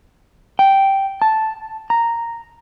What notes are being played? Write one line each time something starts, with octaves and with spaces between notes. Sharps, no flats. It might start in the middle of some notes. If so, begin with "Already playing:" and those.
G5
A5
A#5